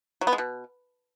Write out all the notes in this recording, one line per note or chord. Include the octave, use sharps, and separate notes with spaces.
F#3
B3
G#3
B2